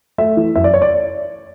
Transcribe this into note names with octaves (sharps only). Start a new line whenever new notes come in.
A3 E5
E3
F#2 E5
D5
C#5
D5